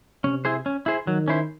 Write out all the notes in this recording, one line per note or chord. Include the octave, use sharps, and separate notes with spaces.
C3 C#4
E4 G#4 C5
C#4
E4 G#4 C5
D#3 F#3
C#4 E4 C5